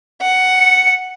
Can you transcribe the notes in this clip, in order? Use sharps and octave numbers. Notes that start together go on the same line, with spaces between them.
F#5
C#7